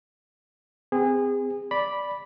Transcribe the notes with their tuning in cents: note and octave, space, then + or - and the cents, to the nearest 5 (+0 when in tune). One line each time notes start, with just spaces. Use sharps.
C4 -30 G#4 -25
D5 -5 B5 -5